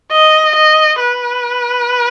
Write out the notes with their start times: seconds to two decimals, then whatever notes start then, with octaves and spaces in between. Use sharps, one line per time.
0.12 D#5
0.56 D#5
1.00 B4